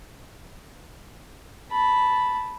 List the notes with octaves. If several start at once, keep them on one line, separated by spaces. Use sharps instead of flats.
A5 B5